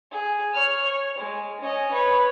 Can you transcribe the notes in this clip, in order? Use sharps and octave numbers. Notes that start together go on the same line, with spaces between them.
G#4
C#5 F6
C#5
G#3
C#4 D#5
B4 C#5